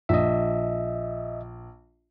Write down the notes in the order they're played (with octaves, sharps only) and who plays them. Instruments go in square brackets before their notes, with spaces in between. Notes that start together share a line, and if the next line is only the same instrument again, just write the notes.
[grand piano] A#1 [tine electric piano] D#5 E5